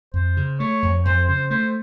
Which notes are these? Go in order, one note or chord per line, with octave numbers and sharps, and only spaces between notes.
F2 C5
C#3
A3 C#5
F2
F2 C5
C#3 C5
A3 C5